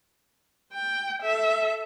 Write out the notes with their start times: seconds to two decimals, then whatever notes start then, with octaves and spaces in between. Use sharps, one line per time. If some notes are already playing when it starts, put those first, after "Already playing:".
0.74 G5
1.23 A4 E5